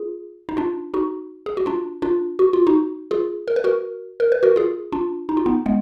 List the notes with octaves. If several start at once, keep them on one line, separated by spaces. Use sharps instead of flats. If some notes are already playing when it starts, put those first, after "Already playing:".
Already playing: F4 G#4
D#4
D4 F4
D#4 F#4
G#4
F#4
D4 F4
D4 F4
F#4
F4
D#4 F#4
F4 G#4
A#4
B4
F#4 A#4
A#4
B4
F#4 A#4
F4 G#4
D4 F4
D#4
F4
B3 D#4
G#3 B3